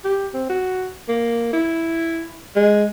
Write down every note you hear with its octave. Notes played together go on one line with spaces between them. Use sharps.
G4
C4
F#4
A#3
E4
G#3